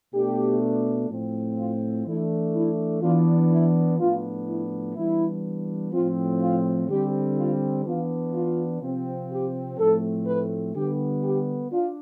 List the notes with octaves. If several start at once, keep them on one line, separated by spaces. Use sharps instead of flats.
B2 A3 D4 G4
A2 F3 C4
F4
E3 A3 D4 E4
E4
E3 B3 D4 F4
E4
A2 F3 B3 D4 F4
E4
E3 G3 B3 D4 E4
A2 F3 C4 F4
F4
D3 G3 C4 G4
F4
E3 B3 D4 F4
F4
C3 F3 C4
G4
A2 F3 A3 C4 A4
B4
D3 G3 B3 G4
G4
D4 F4